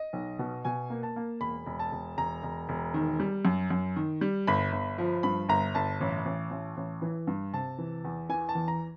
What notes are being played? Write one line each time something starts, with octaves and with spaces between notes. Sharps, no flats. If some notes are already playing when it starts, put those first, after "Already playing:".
Already playing: D#5
B1
B2
B2 G#5
A#3
A5
A#3
E1 B5
E1
A5
E1
E1 A#5
E1
E1
D#3
G3
F#2
F#2
D#3
G3
G1 B5
G1
F3
G2 B5
G1 A#5
G1 A5
A1
A1
A1
A1
E3
G2
C3 A5
E3
E2
E3 G#5
A5
E2
A#5